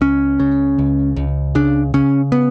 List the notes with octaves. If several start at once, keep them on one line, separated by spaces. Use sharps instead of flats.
C#2 C#4
C#3
C#2
C#2
C#3 D4
C#3 C#4
B3